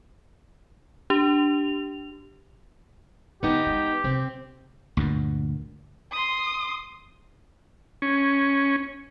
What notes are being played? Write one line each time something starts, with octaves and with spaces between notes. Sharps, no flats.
D4 G4 F7
D3 B3 D#4 G4
G3 G#3
C3 C4
D2 G2 A#2
C6 D#6
C#4